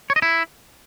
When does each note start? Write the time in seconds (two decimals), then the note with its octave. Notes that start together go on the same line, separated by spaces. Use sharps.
0.10 C#5
0.16 D#5
0.22 E4